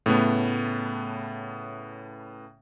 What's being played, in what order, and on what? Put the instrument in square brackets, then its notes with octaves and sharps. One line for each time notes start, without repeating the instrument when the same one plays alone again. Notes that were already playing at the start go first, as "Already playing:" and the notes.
[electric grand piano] A2 C#3 A3 B3